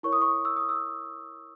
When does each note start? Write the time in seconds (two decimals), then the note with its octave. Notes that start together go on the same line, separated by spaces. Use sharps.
0.03 E4 A#4 C#5 C#6
0.13 D#6
0.22 C#6
0.45 E6
0.57 D#6
0.69 E6